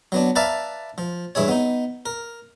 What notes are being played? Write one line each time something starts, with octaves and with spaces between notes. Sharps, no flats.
F#3 B3 D4
B4 D5 E5 F5 A5 A#5
F3
G2 E3 E4 G#4 C#5
B3 D#4
A#4